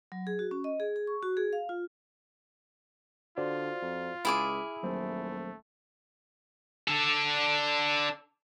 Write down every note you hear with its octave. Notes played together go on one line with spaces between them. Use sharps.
F#3
G#4
F#4
C#4
D#5
G#4
G#4
C#6
F#4
G#4
F5
F4
D3 F4 F#4 C5 D5
F2
C#2 E4 G#4 B5 D6 D#6 F6
D#1 F#3 A3 C5
D4 A4